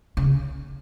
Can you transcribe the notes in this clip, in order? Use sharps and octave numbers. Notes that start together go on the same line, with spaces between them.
C#3